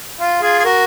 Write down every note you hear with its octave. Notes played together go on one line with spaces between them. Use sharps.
F4
F4 G#4
G#4
F#4 A#4